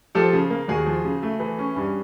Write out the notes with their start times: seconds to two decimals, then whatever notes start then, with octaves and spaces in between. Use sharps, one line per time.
0.15 F3 G4 A4
0.33 C#3
0.50 A#3
0.68 D#2 F#4 G#4
0.86 F3
1.05 C#3
1.23 A3
1.40 E3
1.59 C#4
1.76 G2